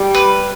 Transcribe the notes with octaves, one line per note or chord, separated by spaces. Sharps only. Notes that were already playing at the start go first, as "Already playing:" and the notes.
Already playing: G3
B4